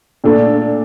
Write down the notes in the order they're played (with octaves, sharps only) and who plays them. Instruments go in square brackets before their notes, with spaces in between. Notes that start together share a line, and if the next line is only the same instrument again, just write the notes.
[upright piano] A#2 A3 D4 A4